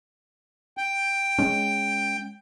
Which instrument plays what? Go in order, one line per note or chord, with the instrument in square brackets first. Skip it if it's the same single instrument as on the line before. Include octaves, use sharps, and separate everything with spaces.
[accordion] G5
[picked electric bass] G#3 C#4